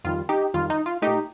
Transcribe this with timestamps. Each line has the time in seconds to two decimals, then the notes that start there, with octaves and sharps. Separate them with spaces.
0.04 F2 D#3 G3 F4
0.29 D#4 G4
0.54 F2 D#3 G3 F4
0.70 D#4
0.86 F4
1.02 A#2 A3 D#4 G4